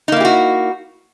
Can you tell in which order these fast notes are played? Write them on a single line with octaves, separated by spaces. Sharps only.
D#4 A#3 E4 G4 F#4